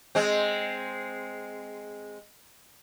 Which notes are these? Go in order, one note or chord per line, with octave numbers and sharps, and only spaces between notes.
G#3 C4